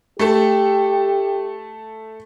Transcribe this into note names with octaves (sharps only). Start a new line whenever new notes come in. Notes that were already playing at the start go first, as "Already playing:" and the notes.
A3 G4 A4